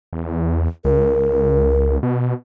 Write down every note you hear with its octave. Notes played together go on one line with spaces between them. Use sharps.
E2
C#2 A#4
B2